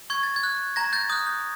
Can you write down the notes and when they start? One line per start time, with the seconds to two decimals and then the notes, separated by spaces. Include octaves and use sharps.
0.10 C#6 G#6
0.23 A6
0.36 G#6
0.43 F#6
0.76 A#5 G#6 A#6
0.93 G6 A6
1.10 D#6 F#6 G6
1.26 G6